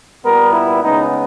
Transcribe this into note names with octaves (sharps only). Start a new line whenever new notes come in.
A#2 G3 B3 A#4
E4
C#3 G#3 B3 D#4